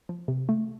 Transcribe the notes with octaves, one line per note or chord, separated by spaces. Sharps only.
F3
C3
A3